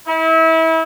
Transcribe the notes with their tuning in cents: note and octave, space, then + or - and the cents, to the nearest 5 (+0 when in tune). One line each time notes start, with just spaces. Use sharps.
E4 -30